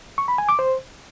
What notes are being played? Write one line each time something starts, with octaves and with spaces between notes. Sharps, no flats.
C#6
B5
G#5
D6
C5